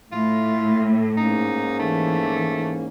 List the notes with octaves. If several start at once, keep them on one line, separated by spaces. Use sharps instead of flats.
A2 E4 F4
G#2 A#3 C#4 D#4
E3 A3